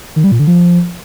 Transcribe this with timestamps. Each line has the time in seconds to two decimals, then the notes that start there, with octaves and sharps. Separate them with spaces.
0.16 D#3
0.24 G3
0.32 A#2
0.39 D3
0.47 F3